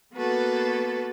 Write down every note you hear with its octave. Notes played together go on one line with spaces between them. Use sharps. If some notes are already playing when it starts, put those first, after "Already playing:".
A#3 B3 F#4 A4 B4